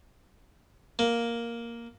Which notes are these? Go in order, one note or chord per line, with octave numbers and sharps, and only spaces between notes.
A#3